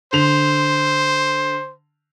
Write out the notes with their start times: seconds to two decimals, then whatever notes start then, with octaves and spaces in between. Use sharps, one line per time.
0.13 D3 C5 F7